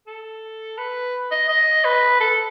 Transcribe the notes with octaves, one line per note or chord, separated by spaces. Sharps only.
A4
B4
D#5
D#5
B4
A4